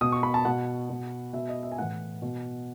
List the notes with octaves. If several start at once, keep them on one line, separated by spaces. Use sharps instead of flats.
B2 D#6
C#6
B5
A5
B2 F#5
B2
B2 E5
D#5
E5
G#5
A2 E3 F#5
B2